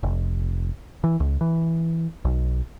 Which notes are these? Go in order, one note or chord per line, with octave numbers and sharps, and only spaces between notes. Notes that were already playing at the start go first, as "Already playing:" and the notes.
F1
E3
C#2
E3
B1